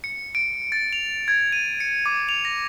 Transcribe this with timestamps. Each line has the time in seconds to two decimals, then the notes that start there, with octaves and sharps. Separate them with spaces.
0.04 C#7
0.35 D7
0.72 A6
0.93 F7
1.28 G#6
1.52 D#7
1.80 C#7
2.06 D6
2.29 F7
2.45 A#6